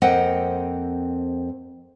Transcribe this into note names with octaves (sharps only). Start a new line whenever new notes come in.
F2 A#3 C4 D#5 F#5 G5